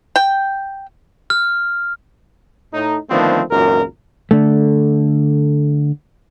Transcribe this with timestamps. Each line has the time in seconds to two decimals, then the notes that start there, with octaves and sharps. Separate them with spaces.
0.16 G5
1.30 F6
2.74 A2 D#4
3.11 D3 D#3 F3 A3 B3 C4
3.51 G#1 C#2 F#2 A#2 A#4
4.31 D3 A3